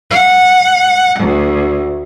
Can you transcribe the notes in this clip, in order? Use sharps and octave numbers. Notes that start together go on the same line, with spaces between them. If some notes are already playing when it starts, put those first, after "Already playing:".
F#5
D2